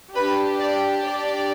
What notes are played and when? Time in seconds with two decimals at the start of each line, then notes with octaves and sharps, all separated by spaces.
0.15 D4 G4 B4
0.59 D5
1.04 D5